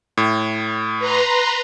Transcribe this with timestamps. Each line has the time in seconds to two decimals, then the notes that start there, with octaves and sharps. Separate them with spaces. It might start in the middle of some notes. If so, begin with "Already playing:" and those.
0.17 A2
0.98 B4 A#5 C6